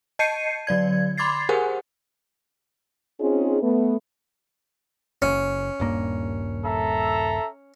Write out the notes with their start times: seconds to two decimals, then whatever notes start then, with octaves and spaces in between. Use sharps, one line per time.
0.19 D#5 A5 G6 C7 C#7 D#7
0.67 D3 F#3 D5 G#6
1.18 B5 C6 D6 G#6 A6 C7
1.49 G4 G#4 A#4 C5 F#5 G#5
3.20 C4 C#4 D#4 F4 G#4
3.62 A3 B3
5.22 F#1 C#4
5.80 D#1 G2 A#3
6.65 A4 E5 A#5